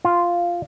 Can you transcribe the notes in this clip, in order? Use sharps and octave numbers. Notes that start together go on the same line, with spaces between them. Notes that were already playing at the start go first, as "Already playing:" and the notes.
F4